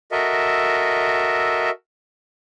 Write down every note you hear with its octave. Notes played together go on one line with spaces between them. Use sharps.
F#4 A4 A#4 D#5 E5